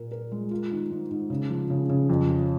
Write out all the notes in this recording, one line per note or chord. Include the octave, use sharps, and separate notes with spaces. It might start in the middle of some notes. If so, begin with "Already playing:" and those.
Already playing: A#2 A#4
A#4
G#3
F4
D#3
G#2
G#2
C#3
F3
C#3
C#3
F2
F3